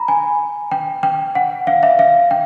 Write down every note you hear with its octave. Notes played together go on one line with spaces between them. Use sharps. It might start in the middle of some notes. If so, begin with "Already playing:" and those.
Already playing: A#5 B5
G#5
G5
G5
F#5
F5
E5
F5
G5